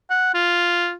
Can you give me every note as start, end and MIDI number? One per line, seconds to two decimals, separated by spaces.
0.10 0.32 78
0.34 0.93 65